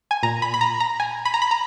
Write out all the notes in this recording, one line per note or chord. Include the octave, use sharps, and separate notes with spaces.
G#5
A#2 A#5
B5
B5
A#5
A#5
G#5
B5
A#5
B5
A#5